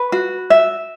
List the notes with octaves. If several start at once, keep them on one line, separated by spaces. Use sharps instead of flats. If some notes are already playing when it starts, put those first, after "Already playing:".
Already playing: B4
F#4
E5